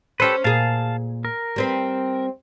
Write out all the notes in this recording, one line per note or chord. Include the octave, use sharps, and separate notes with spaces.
C#4 G4 A4 B4 C5
A#2 G#4 F5 A5
A#4
G3 C4 B4